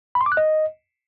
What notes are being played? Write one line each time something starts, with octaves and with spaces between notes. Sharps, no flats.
B5
C6
D6
F#6
D#5